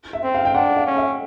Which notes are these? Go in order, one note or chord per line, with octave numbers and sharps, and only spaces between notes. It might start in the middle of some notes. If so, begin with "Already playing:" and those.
E5
C4
F5
G5
D4 F#5
F5
C#4
E5